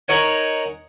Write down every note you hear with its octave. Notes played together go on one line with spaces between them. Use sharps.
D#4 A#4 C#5 F#5 G#5